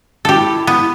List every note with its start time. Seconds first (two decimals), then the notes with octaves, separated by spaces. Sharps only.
0.25 F#4 G4 A4
0.34 E4
0.67 B3